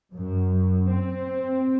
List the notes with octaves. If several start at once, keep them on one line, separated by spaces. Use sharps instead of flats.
F#2
C4